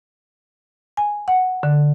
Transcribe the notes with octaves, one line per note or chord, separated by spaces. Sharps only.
G#5
F#5
D3